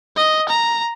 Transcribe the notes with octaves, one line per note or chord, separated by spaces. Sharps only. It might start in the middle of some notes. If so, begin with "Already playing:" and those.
D#5
A#5